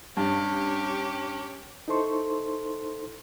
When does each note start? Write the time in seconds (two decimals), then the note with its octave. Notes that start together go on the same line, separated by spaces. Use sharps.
0.17 G2 C#4 G4
1.88 D#4 E4 A4 C5 C6 C#6